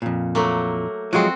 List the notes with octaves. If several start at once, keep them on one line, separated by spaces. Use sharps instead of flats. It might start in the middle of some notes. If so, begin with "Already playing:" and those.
F2 A#2
F#3 A3 A#3
F3 F#3 G#3 C4 F#4